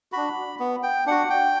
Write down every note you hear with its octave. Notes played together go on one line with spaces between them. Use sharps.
D4 F#4 B5
B3
G5
D4 F#4 F#5
G5